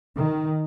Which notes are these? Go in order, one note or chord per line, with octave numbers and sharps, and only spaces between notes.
D#3